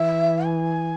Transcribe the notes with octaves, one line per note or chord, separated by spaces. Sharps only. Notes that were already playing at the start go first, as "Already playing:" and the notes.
Already playing: E3 E5
G#5